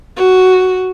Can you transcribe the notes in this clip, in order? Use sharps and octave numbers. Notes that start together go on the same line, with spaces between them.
F#4